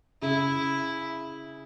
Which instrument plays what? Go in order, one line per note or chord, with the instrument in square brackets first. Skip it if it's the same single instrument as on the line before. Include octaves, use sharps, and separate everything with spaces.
[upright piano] C#3 [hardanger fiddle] E4